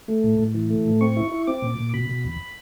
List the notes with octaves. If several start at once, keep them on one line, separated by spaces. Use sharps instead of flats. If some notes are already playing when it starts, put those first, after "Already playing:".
A3
A2
A2
E3
A3
A2
C4 C#6
E4
E4
C4 D6
A#2
A#2
B2 B5
B2
E2